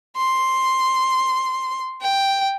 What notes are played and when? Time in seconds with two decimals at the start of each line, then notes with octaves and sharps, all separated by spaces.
0.17 C6
2.01 G5